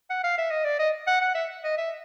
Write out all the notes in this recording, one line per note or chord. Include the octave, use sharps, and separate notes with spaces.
F#5
F5
E5
D#5
D5
D#5
F#5
F#5
E5
D#5
E5